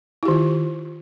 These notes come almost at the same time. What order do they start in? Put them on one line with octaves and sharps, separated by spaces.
E4 G4 D#3 F4